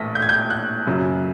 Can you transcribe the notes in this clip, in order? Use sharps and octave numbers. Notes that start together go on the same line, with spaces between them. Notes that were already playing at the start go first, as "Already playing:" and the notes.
Already playing: A#1 A2 E3 A3 A#6 B6
G6
G#6
G6
F#6
F#2 C#3 F#3